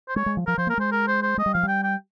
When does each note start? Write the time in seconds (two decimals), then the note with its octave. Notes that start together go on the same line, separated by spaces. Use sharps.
0.09 C5
0.16 G#3 C#5
0.26 G#3
0.37 F3
0.47 F3 A#4
0.58 F3 C5
0.67 A#3 A#4
0.78 G#3 C5
0.92 A#4
1.08 C5
1.23 C5
1.38 G#3 D#5
1.46 G3
1.54 F3 F5
1.63 G3
1.68 G5
1.84 G5